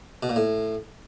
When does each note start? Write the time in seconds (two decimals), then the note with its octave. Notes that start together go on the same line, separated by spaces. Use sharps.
0.23 B2
0.29 A#2
0.36 A2